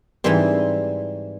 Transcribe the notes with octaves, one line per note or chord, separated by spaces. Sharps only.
G#2 E3 G3 C4